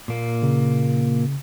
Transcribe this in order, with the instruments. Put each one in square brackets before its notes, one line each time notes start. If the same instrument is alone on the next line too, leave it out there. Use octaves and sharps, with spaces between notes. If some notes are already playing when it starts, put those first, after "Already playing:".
[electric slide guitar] A#2 A#3
[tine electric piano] C#3